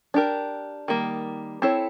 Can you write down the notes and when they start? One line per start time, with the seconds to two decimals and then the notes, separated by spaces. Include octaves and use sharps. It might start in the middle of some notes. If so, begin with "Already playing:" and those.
0.14 D4 G4 A#4
0.88 D#3 G3 A#3
1.62 C4 E4 A4 C#5